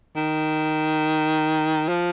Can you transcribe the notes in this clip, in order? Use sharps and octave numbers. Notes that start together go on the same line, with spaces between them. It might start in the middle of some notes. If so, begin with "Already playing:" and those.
D#3
F3